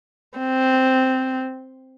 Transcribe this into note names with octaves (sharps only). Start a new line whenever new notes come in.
C4